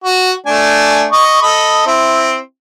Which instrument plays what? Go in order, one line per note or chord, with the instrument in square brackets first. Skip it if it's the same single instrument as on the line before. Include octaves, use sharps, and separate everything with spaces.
[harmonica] F#4
A3 D4 G#5
D#5 C#6
A4 D#5 B5
C4 E4